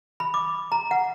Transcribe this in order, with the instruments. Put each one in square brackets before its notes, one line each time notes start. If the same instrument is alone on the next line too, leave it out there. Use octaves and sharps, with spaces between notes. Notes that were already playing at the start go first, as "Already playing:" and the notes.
[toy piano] B5
D6
A#5
F#5